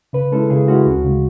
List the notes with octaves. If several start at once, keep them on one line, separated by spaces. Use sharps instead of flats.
C#3 B4
G#3 C#4 E4 A4
C#3 G#4
G#3 C#4 E4 F#4
D2
C#3 G#3